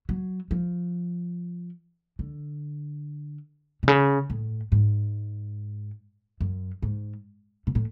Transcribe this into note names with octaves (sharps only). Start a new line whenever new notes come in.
F#3
F3
D3
B2
C#3
A2
G#2
F#2
G#2
B2
A2